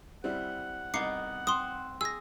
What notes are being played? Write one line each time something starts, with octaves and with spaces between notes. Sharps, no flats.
G3 C4 E4 F#5
C2 B3 D#4 D6 C7 C#7
C4 C6 D#6
G#4 E6 A#6